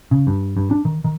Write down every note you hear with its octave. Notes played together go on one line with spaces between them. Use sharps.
C#3
G2
G2
D4
D#3
D#3